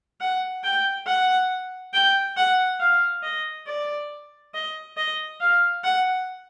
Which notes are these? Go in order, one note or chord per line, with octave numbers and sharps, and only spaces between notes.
F#5
G5
F#5
G5
F#5
F5
D#5
D5
D#5
D#5
F5
F#5